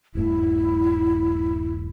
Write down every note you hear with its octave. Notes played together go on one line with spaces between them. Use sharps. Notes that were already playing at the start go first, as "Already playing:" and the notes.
D#1 G2 A3 E4